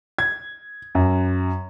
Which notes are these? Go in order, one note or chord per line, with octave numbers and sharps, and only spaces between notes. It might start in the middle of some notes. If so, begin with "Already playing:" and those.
G#6
F#2